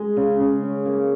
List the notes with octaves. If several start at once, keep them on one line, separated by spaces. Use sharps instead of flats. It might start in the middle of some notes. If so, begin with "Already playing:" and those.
Already playing: G#3
C#3
C#3
C#4
A#3